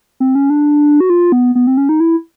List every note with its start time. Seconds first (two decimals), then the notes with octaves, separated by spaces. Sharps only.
0.20 C4
0.35 C#4
0.50 D4
1.00 F#4
1.10 F4
1.32 B3
1.55 B3
1.67 C4
1.77 C#4
1.89 D#4
2.00 E4